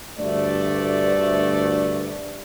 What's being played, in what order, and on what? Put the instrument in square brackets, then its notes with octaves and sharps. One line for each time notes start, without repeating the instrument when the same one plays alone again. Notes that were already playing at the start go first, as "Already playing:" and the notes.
[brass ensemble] D2 G2 A3 D5